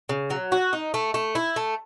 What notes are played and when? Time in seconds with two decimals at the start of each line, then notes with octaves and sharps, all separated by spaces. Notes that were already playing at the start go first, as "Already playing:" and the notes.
0.09 C#3
0.30 F#3
0.52 F#4
0.73 D#4
0.94 A3
1.14 A3
1.35 E4
1.56 A3